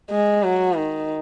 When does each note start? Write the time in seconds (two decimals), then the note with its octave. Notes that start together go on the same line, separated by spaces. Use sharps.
0.10 G#3
0.43 F#3
0.77 D#3